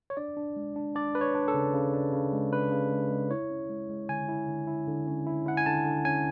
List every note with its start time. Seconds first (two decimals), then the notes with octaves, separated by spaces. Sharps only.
0.10 C#5
0.17 D4 D5
0.37 D4
0.56 G#3
0.76 D4
0.95 D4 D5
1.15 D4 B4
1.21 C#5
1.35 D4
1.48 A4
1.54 C#3
1.74 C#3
1.94 D4
2.13 C#3
2.32 G#3
2.53 D4 B4
2.72 C#3
2.92 G#3
3.11 G#3
3.31 E4 C#5
3.50 C#4
3.70 G#3
3.90 G#3
4.09 D3 G#5
4.29 E4
4.48 D3
4.67 E4
4.88 D3
5.07 C#4
5.27 E4
5.46 E4 F#5
5.57 G#5
5.66 D3 A5
5.86 D3
6.05 C#4 G#5